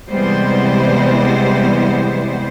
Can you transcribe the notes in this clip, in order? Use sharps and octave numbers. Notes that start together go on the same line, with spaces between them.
C3 E3 G3 G#3 B3 C5